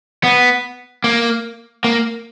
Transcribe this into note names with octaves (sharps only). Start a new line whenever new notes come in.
B3
A#3
A#3